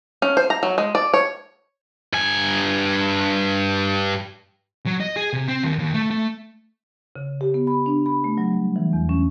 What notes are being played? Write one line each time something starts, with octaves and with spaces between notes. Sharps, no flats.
C#4
C5
A#5
F#3
G#3
D5
C#5
G2 G#5
F#3
D#5
G#4
C3
C4
D#2
D#2
A3
A3
C#3
G4
B3
B5
D4
B5
A3
F#3
G3
E3
E2
C#4